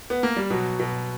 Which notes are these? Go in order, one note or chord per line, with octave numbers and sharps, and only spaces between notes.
B3
A#3
G3
B2 F#3
B2